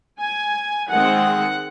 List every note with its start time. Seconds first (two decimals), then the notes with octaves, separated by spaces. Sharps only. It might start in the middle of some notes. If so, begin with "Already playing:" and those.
0.18 G#5
0.89 D#3 G#3 C4 F#5